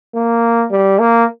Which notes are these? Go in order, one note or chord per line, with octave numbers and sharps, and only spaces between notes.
A#3
G3
A#3